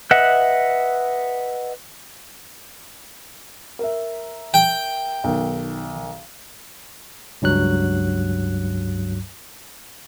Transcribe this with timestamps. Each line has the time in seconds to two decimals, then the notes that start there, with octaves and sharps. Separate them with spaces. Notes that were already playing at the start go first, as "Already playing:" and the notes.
0.11 B4 D#5 E5 F#5
3.79 A#4 E5
4.54 G5
5.24 B1 D#3
7.42 C#2 G2 F#3 F#6